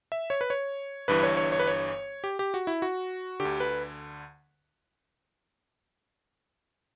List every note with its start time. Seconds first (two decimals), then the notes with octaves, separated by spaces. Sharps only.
0.12 E5
0.30 C#5
0.41 B4
0.50 C#5
1.08 G1 G2 E3 B4
1.23 C#5
1.37 C#5
1.52 C#5
1.59 B4
1.68 C#5
2.24 G4
2.39 G4
2.54 F#4
2.67 E4
2.82 F#4
3.40 D3 G4
3.45 D2
3.60 B4